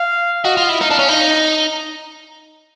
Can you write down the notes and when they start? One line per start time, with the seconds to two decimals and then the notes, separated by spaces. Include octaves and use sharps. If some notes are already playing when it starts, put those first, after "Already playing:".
Already playing: F5
0.44 F#4 D#5
0.57 F4
0.69 E4
0.81 D#4 F5
0.91 D4
0.99 C#4
1.08 D#4